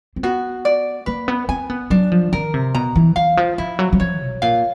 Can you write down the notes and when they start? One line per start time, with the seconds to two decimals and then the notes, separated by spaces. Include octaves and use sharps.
0.16 C4
0.23 B3 F#4
0.65 D5
1.06 A#3 B4
1.28 B3
1.49 C4 G#5
1.70 B3
1.90 F#3 D4
2.12 F3
2.33 D#3 A#4
2.54 C3
2.75 B2 A#5
2.96 E3
3.16 E3 F5
3.37 F3
3.58 F3 E4
3.79 F#3
3.93 F#3
4.00 F3 C#5
4.21 B2
4.42 A#2 F5